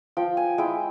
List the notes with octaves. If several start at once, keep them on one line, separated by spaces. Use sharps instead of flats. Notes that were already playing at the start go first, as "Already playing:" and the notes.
F3 G5
G#5
G#3 E4 G5